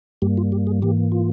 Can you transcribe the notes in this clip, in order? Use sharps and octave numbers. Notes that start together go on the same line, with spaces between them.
G2 G3 A#3 G4
F4
G4
G#4
G#2 E3 A#3 G4
F4